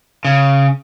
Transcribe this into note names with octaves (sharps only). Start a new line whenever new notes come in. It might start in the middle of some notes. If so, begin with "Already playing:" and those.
C#3